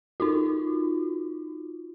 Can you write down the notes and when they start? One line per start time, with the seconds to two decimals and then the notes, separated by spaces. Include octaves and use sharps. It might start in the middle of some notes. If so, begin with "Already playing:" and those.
0.20 D#4 F4 F#4